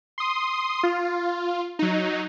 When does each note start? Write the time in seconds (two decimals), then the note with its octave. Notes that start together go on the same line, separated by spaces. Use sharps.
0.18 C6 D#6
0.83 F4
1.79 F#3 D#4